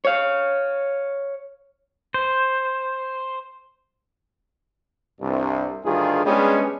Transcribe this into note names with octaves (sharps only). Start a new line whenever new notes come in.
C#5 F5
C5
C2 G2
D2 G2 D#3 F4 G#4
G3 G#3 B3 C#4 D4 G#4